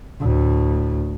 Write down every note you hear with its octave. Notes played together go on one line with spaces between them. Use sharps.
D2 A2